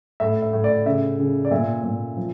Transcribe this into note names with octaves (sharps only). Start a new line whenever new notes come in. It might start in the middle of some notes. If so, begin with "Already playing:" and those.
A2 E5
E5
A2
D5
C#3 E5
C#3
D5
A#2 E5
A#2
F3